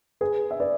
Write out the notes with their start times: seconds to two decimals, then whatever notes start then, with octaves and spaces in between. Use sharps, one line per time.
0.21 G#4 B4
0.51 E5
0.60 B4 D5